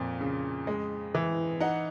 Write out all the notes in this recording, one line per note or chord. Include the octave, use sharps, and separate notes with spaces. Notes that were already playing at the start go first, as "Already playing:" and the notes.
Already playing: F2 A#2
C#3
G#3
E3
D#4 F#5